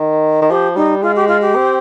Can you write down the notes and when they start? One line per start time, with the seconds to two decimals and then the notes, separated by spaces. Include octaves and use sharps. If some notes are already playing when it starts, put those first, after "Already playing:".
Already playing: D#3
0.42 D#3
0.50 F3 G4
0.76 G3 D#4
1.02 G#3 F4
1.16 G4
1.28 F4
1.41 G4
1.55 C4